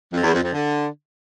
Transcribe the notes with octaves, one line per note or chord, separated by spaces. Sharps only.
F2
E2
F2
F2
D3